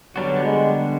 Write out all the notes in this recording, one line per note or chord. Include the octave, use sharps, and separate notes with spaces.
D3 F#3 G3 B3 D4 F#4
G#3